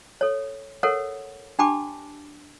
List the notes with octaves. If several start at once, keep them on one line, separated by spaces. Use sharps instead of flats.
A4 C#5
A4 A#4 C#5 F#5
D4 G4 G5 A5 B5 D6